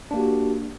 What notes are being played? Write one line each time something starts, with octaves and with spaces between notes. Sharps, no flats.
A#3 D4 F#4 G4